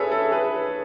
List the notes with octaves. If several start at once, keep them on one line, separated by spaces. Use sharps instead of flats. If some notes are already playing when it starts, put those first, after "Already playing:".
Already playing: G#4 A4 B4 C#5 E5
A4
G#4 B4